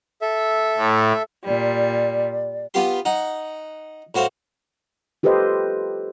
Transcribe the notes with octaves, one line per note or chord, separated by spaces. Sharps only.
A4 E5
A2
A#2 G3 D5
B3 F4 G4 C6
D#4 F#5
A2 F#4 C5 F5
F4 G4 A4 B4 C5 D#5